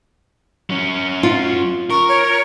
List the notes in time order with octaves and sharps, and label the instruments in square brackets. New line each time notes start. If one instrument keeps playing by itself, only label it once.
[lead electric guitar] F#3 C#4
[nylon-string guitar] F4
[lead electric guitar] A#4 [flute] C#6
[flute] C#5